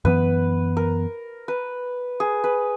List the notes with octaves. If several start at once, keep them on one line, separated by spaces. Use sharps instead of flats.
F#2 E3 B3 B4
A#4
B4
G#4
B4